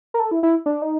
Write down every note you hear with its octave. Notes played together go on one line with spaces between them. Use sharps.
A#4
A4
E4
E4
D4
D#4